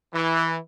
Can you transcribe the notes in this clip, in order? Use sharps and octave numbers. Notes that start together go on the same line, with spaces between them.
E3